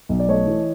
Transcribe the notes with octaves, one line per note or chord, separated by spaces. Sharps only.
B1
D5
A3 C#5 D#5
E3